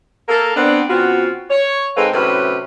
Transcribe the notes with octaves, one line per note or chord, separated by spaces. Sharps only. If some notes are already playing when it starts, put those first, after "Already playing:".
A#3 A4 A#4
B3 C4 D4
C#3 B3 C4 F4 F#4
C#5
G#2 G#3 C4 A4 B4 F5
A2 C3 F#3 C#4 B4 C5